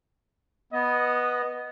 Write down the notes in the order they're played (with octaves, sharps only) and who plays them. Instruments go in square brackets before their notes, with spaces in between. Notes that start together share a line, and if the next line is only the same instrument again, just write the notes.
[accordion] B3 [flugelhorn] D#5